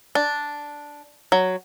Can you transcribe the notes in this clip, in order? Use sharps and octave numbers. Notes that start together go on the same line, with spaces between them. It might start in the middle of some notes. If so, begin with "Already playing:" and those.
D4
F#3